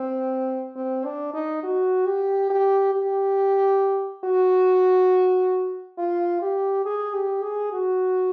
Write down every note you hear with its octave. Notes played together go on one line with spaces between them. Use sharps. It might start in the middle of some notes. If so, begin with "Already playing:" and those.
Already playing: C4
C4
D4
D#4
F#4
G4
G4
G4
F#4
F4
G4
G#4
G4
G#4
F#4